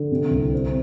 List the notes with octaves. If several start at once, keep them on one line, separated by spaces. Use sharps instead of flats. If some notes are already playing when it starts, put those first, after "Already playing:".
Already playing: D3
C3
C2
C4